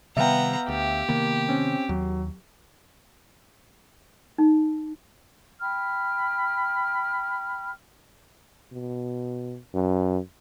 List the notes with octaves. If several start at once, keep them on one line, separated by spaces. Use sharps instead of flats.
C3 D#3 G3 B3 E5 F5 G5 A#5
D2 G4
C3 D#3 A#3 B3
C4 C#4
D#2 F#3
D#4
G5 B5 F6
B2
F#2